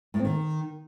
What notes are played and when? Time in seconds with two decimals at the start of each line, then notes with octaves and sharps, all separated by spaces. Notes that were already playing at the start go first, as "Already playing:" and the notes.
0.14 A2
0.19 C4
0.25 D#3